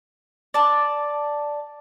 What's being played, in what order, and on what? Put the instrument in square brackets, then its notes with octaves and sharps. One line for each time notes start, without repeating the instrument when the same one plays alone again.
[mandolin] D5 A5